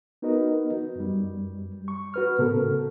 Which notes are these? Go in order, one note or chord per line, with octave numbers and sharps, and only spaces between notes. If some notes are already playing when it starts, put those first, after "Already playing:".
B3 D#4 F#4 A#4 B4 D#5
F#2 G3
C#6
F#4 B4 F6
A2 C#3 B3 A4 A#4